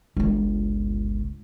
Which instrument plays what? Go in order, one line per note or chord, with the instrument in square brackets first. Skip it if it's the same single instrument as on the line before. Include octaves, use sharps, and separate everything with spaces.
[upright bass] G1 C#2